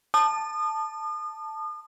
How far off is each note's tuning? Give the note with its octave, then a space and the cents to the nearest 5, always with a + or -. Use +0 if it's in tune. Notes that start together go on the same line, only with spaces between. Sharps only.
A5 +0 D#6 -40